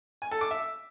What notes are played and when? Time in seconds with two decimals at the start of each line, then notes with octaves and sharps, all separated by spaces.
0.22 G#5
0.31 A4
0.41 D6
0.51 E5